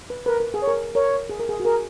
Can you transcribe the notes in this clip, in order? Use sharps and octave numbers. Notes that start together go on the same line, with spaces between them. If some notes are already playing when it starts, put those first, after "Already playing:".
B4
A#4 B4
A#4
G#4
C#5
A#4
A#4 C#5
G#4
A#4
G#4
F#4
G#4 A#4